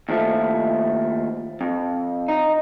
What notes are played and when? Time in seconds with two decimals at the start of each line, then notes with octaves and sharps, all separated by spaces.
0.09 D#2 F3 A3
1.61 F2
2.28 D#4